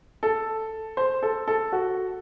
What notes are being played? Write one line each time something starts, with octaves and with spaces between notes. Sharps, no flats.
A4
C5
A4
A4
F#4